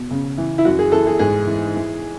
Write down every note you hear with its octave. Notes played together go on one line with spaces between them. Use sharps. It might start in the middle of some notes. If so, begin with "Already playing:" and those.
Already playing: B2
C#3
E3
E4
F#2 F#4
G#4
E3 A4
G#4
G#2 G#4
E3
E3